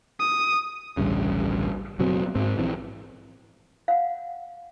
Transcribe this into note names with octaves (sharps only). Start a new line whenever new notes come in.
D#6
A1 D2 G2 C#3
F#1 B2 F#3 C4
G#2 C4
A#1 E3 C4
F5 F#5